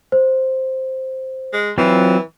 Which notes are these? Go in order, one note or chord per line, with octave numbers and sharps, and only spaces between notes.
C5
G#3
E3 F#3 C4 F4